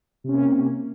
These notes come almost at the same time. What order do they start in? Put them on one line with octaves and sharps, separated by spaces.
C3 C#4 A#3